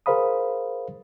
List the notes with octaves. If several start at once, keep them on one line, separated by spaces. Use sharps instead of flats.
G#4 A#4 C5 F5 B5 D#6